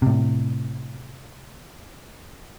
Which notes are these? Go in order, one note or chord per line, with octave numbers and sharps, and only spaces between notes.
A2 C3